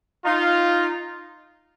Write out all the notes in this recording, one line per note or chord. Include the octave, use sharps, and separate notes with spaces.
D#4 F4